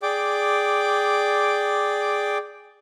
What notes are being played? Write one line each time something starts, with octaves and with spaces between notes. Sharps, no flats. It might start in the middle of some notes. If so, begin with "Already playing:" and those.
G#4 D5 G5 D6